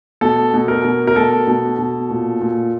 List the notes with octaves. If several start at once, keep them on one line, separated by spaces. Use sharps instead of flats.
B2 A4
B2
A#4
B2
A#4
B2 A4
B2
B2
A#2
A#2